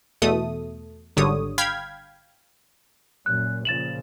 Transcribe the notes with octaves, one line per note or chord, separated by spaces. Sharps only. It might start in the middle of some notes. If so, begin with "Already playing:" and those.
E2 B2 A3 A4 D#6
G#1 D3 G3 C#5 D#6
F5 G5 B5 F6 G#6 B6
F#2 A#2 F#6
A#2 C#3 F3 A6 E7 F#7